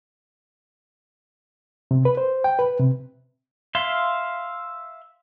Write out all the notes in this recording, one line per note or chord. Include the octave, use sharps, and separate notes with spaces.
C3
B4
C5
G5
B4
C3
E5 F5 C6